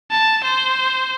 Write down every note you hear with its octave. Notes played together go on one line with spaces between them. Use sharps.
A5
C5